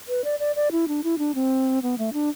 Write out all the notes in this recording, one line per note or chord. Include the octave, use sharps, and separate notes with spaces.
B4
D5
D5
D5
E4
D4
E4
D4
C4
B3
A3
D4